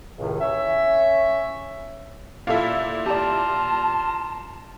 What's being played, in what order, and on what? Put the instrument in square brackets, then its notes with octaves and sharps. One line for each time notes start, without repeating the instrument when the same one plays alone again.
[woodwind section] C#2 A2 C3 D#3
C#4 C#5 E5
[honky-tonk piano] A#2 E5 [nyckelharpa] E4 [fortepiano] F4 A4 F5
[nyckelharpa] F4 A#5 [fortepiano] G4 D5 [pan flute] A5